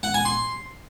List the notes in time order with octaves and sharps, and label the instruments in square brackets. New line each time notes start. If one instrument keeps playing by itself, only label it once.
[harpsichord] F#5
G#5
C6